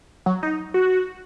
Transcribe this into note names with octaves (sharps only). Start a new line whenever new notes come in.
F#3
D#4
F#4